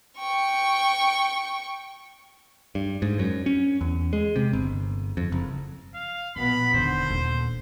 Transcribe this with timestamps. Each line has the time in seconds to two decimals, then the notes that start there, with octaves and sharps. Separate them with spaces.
0.18 G5 C#6
2.75 G2
3.02 G#2
3.19 F#2
3.46 C#4
3.81 E2
4.13 G#3
4.36 C3
4.53 G1
5.17 F2
5.32 F#1
5.94 F5
6.36 A#1 B2 B3 B5
6.74 E1 D3 D#3 C5
7.10 D#1